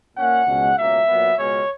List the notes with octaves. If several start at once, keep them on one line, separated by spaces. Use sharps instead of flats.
A#2 A#3 C#4 F#5
C#2 B2 G#3 C#4
C#2 B2 A#3 C#4 E5
A#2 F#3 B3
C#2 B2 G#3 C#4 C#5